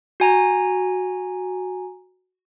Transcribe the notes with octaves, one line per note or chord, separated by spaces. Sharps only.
F#4 G#5 A#5